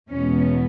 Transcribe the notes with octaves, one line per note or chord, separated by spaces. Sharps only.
E2 B2 G#3 B3 C#4